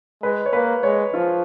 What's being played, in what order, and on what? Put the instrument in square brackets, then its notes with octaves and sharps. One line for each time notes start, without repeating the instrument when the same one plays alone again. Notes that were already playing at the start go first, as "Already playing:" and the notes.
[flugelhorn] G#3 [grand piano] B4
[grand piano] C#5
[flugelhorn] A#3 [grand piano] B4
[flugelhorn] G#3 [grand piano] C#5
[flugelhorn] F3 [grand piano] F4